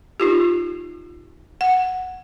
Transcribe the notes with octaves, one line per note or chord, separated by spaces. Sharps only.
D#4 F4 G4
F#5